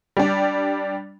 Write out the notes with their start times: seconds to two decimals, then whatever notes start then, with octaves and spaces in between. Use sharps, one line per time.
0.17 G3 D4